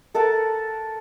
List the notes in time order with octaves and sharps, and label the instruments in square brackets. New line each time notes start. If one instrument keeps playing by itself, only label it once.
[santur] A4 A#4 F#5 A5